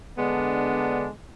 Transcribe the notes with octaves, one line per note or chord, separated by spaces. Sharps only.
D3 G#3 B3 D4